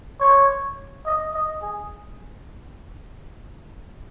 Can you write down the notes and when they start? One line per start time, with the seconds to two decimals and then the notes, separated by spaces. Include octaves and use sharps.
0.20 C#5
1.05 D#5
1.34 D#5
1.62 G#4